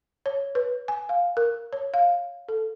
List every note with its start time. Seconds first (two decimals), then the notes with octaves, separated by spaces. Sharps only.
0.26 C#5
0.55 B4
0.88 G#5
1.09 F5
1.37 A#4
1.73 C#5
1.94 F5
2.48 A4